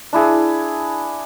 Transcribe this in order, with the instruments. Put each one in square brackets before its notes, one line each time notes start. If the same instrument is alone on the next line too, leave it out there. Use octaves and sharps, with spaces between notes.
[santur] D4 E4 G#4